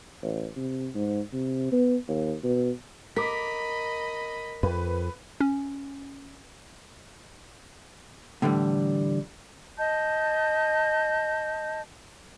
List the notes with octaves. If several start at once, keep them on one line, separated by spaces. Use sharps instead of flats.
A1
C3
G#2
C3
B3
D#2
B2
A#4 D#5 B5 D6 B6
F2 B4
C#4
A2 D3 E3 G3
D#5 A5 G6